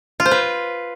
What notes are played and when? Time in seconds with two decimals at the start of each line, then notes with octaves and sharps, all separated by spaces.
0.20 F4
0.26 C5
0.31 B4